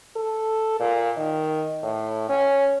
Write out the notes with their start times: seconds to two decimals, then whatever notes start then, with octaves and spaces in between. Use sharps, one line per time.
0.16 A4
0.80 A#2
1.17 D#3
1.83 A2
2.29 C#4